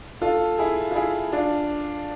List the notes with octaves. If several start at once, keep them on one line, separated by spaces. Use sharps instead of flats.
F4 A4
E4 G#4
F4
E4 G#4
D4 F4